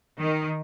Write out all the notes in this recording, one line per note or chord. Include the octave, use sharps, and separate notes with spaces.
D#3